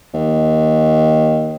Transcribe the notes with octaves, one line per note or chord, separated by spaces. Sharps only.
D#2